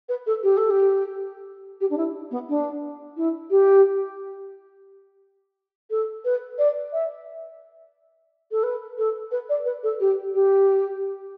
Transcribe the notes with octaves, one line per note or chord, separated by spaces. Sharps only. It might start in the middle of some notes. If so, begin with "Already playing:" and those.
B4
A4
G4
A4
G4
G4
D4
E4
B3
D4
E4
G4
A4
B4
D5
E5
A4
B4
A4
B4
D5
B4
A4
G4
G4